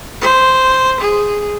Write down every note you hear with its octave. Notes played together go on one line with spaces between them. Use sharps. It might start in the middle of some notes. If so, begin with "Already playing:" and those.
C5
G#4